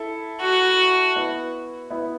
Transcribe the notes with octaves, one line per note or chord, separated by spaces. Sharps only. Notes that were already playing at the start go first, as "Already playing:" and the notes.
Already playing: E4 A4
F#4
B3 E4
B3 E4